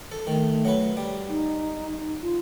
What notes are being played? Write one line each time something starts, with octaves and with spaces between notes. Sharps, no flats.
A4
D#3 A3
F#3 B4
G3
D#4
F4